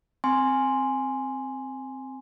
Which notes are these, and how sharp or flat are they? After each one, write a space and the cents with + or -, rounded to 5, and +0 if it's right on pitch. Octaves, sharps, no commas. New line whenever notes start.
C4 +0 G#5 +0 C6 +0